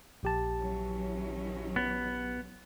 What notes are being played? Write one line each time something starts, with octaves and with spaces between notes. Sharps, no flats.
A#1 G4 A5
E3 F#3 C#4
B3